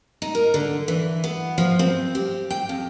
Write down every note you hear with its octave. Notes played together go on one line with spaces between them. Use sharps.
D#4
A#4
D3
E3
B3
F3
C4
G4
G5
F2